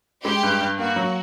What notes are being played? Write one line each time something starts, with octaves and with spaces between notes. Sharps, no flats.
G#3 G4
G2
G2
A#3 F#4
F#3